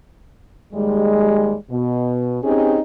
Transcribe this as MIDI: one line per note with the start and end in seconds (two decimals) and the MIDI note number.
0.74 1.54 39
0.74 1.54 55
0.74 1.54 56
1.70 2.39 47
2.43 2.79 60
2.43 2.79 61
2.43 2.79 63
2.43 2.79 67
2.43 2.79 68